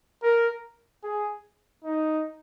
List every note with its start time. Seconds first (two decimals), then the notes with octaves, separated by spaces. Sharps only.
0.23 A#4
1.03 G#4
1.84 D#4